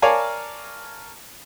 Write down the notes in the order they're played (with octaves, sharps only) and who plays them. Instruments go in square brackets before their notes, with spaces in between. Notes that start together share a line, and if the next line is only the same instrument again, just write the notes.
[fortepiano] A#4 C#5 D5 F5 G#5 A5